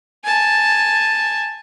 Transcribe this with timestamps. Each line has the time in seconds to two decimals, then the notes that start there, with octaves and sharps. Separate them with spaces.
0.25 G#5 A5